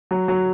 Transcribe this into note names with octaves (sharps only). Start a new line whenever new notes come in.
F#3
F#3